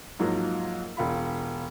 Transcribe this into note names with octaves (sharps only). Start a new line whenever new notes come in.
G#2 F3 F#3 A#3
E1 F4 B5